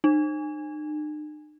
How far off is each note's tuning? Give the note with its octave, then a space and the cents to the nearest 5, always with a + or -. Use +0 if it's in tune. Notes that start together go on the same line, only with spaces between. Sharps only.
D#4 -45